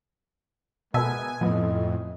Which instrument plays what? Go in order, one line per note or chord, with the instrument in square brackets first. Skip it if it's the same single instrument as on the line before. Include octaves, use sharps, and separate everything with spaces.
[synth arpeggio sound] B2 A4 E5 [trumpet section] G#3 B3 A#4 [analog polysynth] G#5
[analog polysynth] F2 A2 [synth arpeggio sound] F3 B3 [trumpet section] D#5